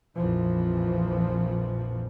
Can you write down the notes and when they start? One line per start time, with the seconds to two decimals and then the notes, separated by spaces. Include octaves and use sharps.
0.16 A#1 F2 A#2 E3 F3